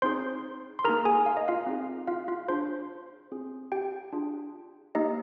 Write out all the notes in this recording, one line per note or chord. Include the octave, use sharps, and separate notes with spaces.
C4 D#4 G#4 C5 C6
C6
A#3 D#4 G#4 A#4 A#5
G#4 G#5
F5
D#5
F4 F5
C4 D#4 G#4
F4 F5
F4 F5
D4 F4 G#4 C5 C6
C4 F4 G#4
G4 G5
D4 F4 G#4
A#3 D#4 G4 D#5